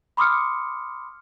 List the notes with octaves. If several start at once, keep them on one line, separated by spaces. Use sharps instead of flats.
B5 C6 D6 D#6 F6 C#7